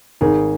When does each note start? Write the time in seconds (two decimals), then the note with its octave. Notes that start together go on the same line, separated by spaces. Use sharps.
0.21 G#1 G#4 A#4